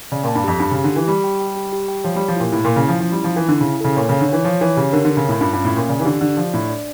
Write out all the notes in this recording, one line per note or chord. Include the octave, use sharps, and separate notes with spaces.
C#3 D5
A#2 A5
G2
F2 G4
G2 G4
C#3 G4
D3
E3 G4
G3 G4
G5
G5
G4
G4
G5
F3 C#5
G3 G4
F3
A#2 E4
A2 E4
A#2 E4
C#3
F3 E4
F3 C#4
G3 E4
F3
E3 E4
D3 E4
C#3 E4
C#3 A4
A#2 C#5
C#3 C#5
D3
E3 C#5
F3 C#5
E3 C#5
C#3 G4
D3 A#4
D3 A#4
C#3
A2 C#4
G2 F4
G2 C#4
A2
A#2 C#4
C#3 D5
E3
D3 G4
D3 D5
F3 D5
A2 D4
D5